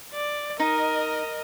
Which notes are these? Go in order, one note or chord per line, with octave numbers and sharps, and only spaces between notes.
D5
D#4 A#4 D#5